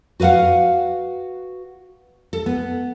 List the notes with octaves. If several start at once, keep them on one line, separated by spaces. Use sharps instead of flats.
F#4 B4 C5 F5 F#5
A4
B3